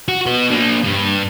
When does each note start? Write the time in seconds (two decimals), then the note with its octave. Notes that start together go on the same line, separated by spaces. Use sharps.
0.08 F#4
0.26 B3 F#4
0.51 A#3 D4
0.84 G2